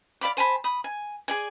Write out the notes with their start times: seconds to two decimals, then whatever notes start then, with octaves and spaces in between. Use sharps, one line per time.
0.21 D5 F5 B5 D6
0.37 C5 G#5 A5 B5
0.64 B5 D#6
0.84 G#5
1.28 G#4 D5 G#5